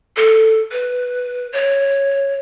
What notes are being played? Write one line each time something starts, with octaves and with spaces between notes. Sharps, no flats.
A4
B4
C#5